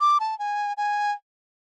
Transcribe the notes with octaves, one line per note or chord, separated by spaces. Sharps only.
D6
A5
G#5
G#5